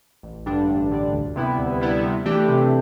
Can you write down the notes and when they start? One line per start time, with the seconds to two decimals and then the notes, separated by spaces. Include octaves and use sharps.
0.23 A1
0.46 G2 D3 G3 D4
0.68 A1
0.91 G2 D3 G3 D4
1.13 D2
1.36 C3 G3 B3 E4
1.58 D2
1.80 C3 G3 B3 E4
2.03 C3
2.25 E3 A3 D4 G4
2.48 C3